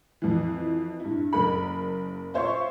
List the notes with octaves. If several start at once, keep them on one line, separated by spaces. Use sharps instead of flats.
F2 E3
G2 E4
F#1 A#4 B5
F4 C5 C#5 E5 C#6